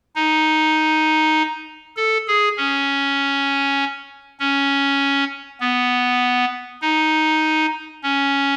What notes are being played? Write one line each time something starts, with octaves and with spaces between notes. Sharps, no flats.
D#4
A4
G#4
C#4
C#4
B3
D#4
C#4